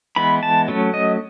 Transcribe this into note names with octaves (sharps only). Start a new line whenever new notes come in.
E3 G#3 B3 B5
A5
F#3 A3 C#4
D#5